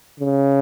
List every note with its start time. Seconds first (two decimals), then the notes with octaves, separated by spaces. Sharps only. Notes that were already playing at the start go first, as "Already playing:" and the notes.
0.20 C#3